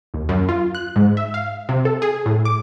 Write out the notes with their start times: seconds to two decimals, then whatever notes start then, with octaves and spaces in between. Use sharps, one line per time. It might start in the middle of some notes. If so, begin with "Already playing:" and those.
0.14 D#2
0.29 F#2
0.49 F4
0.75 F#6
0.96 G#2
1.17 E5
1.34 F5
1.69 C3
1.85 A4
2.02 G#4
2.26 A2
2.45 D6